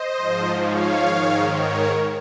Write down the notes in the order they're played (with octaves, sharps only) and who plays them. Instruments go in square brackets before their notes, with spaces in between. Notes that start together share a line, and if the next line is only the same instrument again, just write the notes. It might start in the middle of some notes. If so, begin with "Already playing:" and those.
Already playing: [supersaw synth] C5 D#5
G#2 F3
C#5 F5
G#2 D#3
A#4 C#5